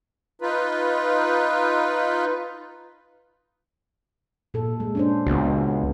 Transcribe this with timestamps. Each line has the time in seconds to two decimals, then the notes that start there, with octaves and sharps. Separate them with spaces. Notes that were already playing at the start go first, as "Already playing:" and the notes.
0.42 D#4 F4 B4
4.54 A#2 A4
4.80 G#3
4.95 C#4 D4 C5
5.27 C#2 B3 F#4